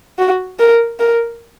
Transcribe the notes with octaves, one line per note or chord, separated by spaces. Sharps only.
F#4
A#4
A#4